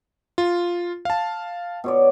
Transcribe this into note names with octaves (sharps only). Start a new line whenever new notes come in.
F4
F5 A5
B2 C#5 D5